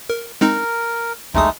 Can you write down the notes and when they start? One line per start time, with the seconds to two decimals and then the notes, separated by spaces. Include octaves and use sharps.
0.10 A#4
0.41 G#3 C4 D#4 A#4
1.34 A#1 D#2 G#3 A3 D#4 D#6